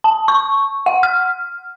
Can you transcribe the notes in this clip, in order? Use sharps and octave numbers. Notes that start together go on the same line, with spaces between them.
A5
C#6
F#5
F6